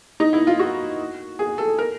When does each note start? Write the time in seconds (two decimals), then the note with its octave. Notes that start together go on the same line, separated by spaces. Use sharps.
0.20 D#4
0.33 E4
0.47 F4
0.59 F#4
1.39 G#4
1.58 A4
1.79 A#4